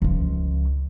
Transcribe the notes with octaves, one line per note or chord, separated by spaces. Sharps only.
C#2 F3